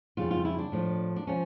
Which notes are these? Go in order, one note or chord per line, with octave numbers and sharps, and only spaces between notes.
F2 C#3 G3 F4
F4
E4
D4
A2 F3
D4
F3 C#4